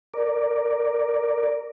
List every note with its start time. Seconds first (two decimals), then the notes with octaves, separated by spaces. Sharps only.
0.14 A#4 D5